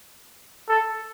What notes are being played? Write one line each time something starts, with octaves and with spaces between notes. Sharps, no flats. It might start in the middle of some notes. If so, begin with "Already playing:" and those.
A4